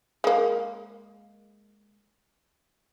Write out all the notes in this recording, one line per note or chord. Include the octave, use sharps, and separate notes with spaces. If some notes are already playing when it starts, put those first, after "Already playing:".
G#3 A#3